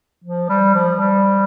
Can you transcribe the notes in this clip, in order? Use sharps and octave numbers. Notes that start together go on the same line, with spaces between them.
F3
G3
F3
G3